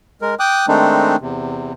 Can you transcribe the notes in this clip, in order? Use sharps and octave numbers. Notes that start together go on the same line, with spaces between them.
G#3 A#4
G5 D6 D#6 F#6
D#3 G#3 A3 C4 D4 D#4
E2 C3